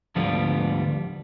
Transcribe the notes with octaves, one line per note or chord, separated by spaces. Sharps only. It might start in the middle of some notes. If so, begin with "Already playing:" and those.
D2 G#2 D3 F3 G3 B3